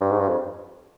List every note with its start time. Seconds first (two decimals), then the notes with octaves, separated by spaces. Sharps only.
0.01 G2
0.11 G#2
0.20 G2
0.29 F2